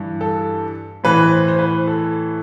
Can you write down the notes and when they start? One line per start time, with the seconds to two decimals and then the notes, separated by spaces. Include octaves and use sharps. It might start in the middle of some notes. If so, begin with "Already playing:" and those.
Already playing: G2 E3
0.21 A4
1.04 A2 E3 B4
1.31 C5
1.48 C5
1.59 B4
1.87 A4